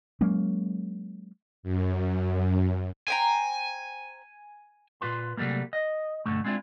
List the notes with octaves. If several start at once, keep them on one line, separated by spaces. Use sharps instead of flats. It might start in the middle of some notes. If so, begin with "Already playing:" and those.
F#3 G#3 A#3 C#4
F#2
C5 G5 G#5 A#5
A#2 C#3 F4 B4 C6
C3 F#3 G3 A3 A#3
D#5
B1 G2 D3 A3
G#3 C4 D4 E4 F4